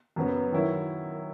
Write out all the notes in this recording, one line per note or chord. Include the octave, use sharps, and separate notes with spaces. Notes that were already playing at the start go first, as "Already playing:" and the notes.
F#2 C#3 F#3 B3
D#3 F#3 C#4 E4